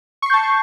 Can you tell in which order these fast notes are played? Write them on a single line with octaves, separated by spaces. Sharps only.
C#6 C7 G6 A5